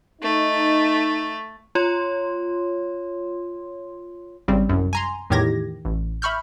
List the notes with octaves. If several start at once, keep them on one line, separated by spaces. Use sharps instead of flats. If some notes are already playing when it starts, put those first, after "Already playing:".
A3 D#4
F4 C#5 C6
G#1 C#3 G3 C4
C2 F#2
G#5 A#5 C6
E2 A2 D#3 G4 G#6 A#6
A1
E5 B5 C#6 F6 G6